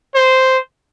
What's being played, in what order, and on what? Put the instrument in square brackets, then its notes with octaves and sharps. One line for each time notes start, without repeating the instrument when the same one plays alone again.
[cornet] C5